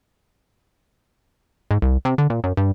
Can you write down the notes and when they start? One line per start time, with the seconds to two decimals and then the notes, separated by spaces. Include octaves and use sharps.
1.71 G#2
1.82 C2
2.05 C3
2.18 D3
2.30 A#2
2.44 F#2
2.57 G2